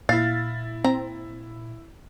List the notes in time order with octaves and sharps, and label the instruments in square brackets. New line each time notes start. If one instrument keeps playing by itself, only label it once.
[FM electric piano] A#2 [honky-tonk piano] E4 A6 [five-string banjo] F5
[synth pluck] C4 [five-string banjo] A#5